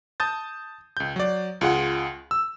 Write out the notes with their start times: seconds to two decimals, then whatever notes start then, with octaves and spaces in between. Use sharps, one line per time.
0.20 A5 D#6 G6 A6
0.97 C#2 G6
1.16 F#3 D5
1.61 C#2 F4 G#4 F#5
2.31 E6